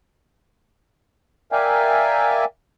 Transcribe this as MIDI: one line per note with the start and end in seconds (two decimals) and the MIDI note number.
1.52 2.45 70
1.52 2.45 74
1.52 2.45 76
1.52 2.45 77
1.52 2.45 79
1.52 2.45 80